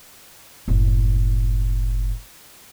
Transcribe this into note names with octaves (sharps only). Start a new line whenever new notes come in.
F#1 A2